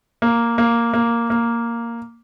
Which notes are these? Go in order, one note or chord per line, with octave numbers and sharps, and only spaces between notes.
A#3
A#3
A#3
A#3